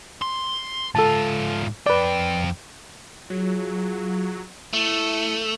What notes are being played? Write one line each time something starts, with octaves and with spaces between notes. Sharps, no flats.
C6
G#2 F4 A4 A5
F2 B4 D5 G5
F#3 F4 G#4
A3 E4 C#7 D#7